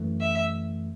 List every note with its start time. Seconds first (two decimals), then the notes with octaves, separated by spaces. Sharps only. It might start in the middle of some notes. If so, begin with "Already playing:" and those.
Already playing: F#2 E3 A3
0.21 E5